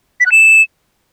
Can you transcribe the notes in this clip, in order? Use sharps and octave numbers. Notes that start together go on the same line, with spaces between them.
B6
F#6
E7